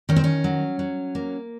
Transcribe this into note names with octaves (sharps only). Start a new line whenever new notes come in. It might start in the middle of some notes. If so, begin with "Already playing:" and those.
D#3 C#4
C4
C#4
F#3
F#3
A#3